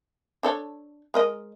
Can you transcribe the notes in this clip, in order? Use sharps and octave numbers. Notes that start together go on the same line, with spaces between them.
D4 A4 C#5
G#3 A#4 D#5